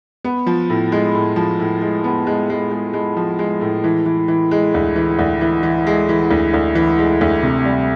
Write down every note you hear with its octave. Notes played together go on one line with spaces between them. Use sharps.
B3
F3
A2
G#3
A2
F3
A2
G#3
B3
G#3
G#3
G#3
G#3
F3
G#3
A2
E3
E3
E3
G#3
D2
E3
D2
E3
E3
G#3
E3
D2
D2
E3
G#3
D2
C3
G3